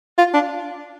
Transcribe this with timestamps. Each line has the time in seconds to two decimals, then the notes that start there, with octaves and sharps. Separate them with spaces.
0.18 F4
0.34 D4